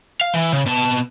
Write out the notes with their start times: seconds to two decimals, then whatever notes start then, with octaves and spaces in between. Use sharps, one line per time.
0.21 F5
0.34 E3
0.52 C#3
0.66 B2 A5